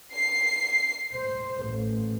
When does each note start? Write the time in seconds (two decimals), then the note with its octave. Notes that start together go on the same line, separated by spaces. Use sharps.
0.12 C7
1.15 C5
1.64 A1